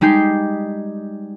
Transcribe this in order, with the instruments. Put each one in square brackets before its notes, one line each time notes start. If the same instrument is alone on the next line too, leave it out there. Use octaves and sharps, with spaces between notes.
[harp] G3 G#3 D#4 G4 G6 C7